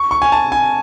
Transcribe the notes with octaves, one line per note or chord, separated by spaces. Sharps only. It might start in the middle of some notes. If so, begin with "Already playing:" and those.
Already playing: C#6
C#6
G#5
A5
G#5